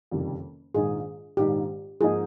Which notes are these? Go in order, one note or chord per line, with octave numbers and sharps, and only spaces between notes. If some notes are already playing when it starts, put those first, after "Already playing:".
F#1 F2 C3 D#3 G3
A#1 G#2 D#3 G#3 G#4
A#1 G#2 D#3 G#3 G4
G#2 F3 A#3 D#4 G#4